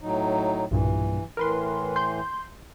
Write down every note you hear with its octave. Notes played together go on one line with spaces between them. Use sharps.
A2 F#3 D#4
B1 G2 A#2 E3
A2 E3 A#4 B4 C6
C6 G6